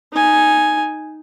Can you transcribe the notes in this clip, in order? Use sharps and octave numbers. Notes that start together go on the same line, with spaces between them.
D#4 G#5